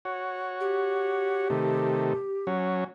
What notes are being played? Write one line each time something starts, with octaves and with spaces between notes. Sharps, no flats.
F#4 C#5
G4
C3 D#3 A3
F#3 C#4